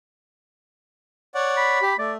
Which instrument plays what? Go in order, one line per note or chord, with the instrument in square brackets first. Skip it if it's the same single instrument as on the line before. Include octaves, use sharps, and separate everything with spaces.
[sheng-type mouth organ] C#5 D5 F#5
[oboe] B5
[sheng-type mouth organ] G4
[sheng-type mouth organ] A3 [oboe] D5